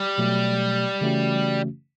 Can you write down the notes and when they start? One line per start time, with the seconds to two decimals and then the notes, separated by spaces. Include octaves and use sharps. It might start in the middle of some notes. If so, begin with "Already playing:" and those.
Already playing: G3
0.18 B2 F#3 A3
1.01 C#3 E3 A3 C#4 F#4